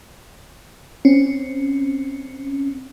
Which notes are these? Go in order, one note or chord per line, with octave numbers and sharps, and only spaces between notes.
C4 C#4